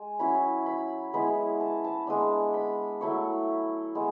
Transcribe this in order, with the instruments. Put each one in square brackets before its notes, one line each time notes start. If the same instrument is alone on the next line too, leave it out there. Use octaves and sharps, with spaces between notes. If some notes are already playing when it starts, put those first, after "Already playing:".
Already playing: [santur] G#3
F#3 C#4 E4 B5
B5
G#3 B3 E4 B5
A5
A5
G#3 B3 D4
B5
F#3 A3 E4 C#6
G#3 B3